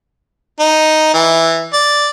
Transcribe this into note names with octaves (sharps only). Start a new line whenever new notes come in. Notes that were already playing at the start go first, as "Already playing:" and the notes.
D#4
E3
D5